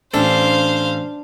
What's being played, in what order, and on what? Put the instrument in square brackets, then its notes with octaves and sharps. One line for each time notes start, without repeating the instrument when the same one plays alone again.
[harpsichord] A1 A4 [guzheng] D4 [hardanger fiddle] C5 F5